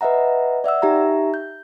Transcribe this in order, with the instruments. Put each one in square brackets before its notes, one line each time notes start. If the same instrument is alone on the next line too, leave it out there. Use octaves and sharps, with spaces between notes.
[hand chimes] B4 D#5 E5 F#5 A#5
D5 E5 F#5 E6
D#4 G4 E5 A#5
G6